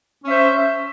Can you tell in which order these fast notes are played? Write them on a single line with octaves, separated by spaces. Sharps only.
C#4 E5 C5